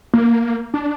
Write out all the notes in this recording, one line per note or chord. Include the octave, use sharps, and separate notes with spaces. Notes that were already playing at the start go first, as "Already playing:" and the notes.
A#3
D4